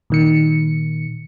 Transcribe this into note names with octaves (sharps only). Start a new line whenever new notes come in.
A#2 D#3 C#7